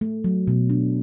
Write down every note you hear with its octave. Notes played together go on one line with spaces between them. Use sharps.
A3
F#3
B2
D4